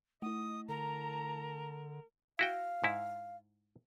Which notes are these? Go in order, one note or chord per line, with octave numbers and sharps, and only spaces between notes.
A3 E4 D#5 D#6
D3 A#4 A5 A#5
E4 F#4 F5 G5
G#2 E4